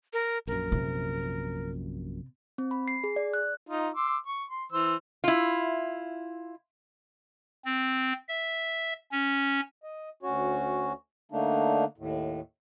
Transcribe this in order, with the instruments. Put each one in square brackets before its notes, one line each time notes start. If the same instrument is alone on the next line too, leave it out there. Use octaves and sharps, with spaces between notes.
[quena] A#4
[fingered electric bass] A#1 F#2 [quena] A#4
[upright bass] C3
[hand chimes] C4
B5
C7
G#4
D5
F#6
[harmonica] D#4 F4
C6 D6 E6
C#6
C6
E3 C5 E6
[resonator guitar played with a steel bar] E4 F4
[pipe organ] C4
E5
C#4
[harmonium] D#5
D2 C#4 F#4 C#5
D3 A3 A#3 D4 D#4
D#2 A2